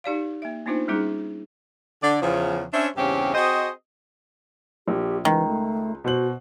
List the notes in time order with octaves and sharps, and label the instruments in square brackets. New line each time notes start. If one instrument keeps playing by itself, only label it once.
[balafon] D#4 G4 D5 F5
A#3 E5
A#3 B3 D4 D#4 F4 C5
G3 G#3 C#4 D#4 E4 G#4
[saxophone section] D3 D5
E2 C#3 F3
C#4 D4 C5 C#5 E5
E2 G2 C#3 C4 C#4 G4
C4 F#4 G#4 C5 D#5
[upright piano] A#1 [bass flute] G4
[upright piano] C#2 [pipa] D#3 [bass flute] E3
[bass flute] A3
[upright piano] B2 C5 F#7 [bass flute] F#4